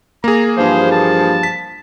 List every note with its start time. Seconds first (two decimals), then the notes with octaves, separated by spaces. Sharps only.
0.24 A#3 G#4 A#5
0.58 G2 E3 F3 C5
0.92 A5
1.43 B6